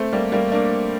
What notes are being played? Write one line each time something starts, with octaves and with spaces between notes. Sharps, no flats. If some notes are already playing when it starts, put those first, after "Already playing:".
Already playing: A3 C4
G3 A#3
G3 A#3
A#3 D4